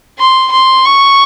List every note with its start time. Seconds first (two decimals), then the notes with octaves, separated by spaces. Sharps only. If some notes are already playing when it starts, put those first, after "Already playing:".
0.18 C6
0.52 C6
0.85 C#6